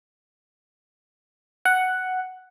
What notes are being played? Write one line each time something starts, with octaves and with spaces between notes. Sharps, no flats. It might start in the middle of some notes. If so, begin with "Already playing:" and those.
F#5